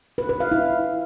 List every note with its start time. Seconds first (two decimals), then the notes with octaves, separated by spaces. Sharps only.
0.18 B4
0.29 B4
0.40 F5
0.52 E4